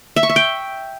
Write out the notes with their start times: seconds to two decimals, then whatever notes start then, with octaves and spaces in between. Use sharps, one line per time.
0.16 E5
0.23 C#6
0.30 E5
0.36 G5